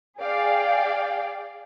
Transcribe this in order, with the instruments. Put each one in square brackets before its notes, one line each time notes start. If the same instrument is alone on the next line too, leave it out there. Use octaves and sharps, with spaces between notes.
[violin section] G#4 D5 F5 G5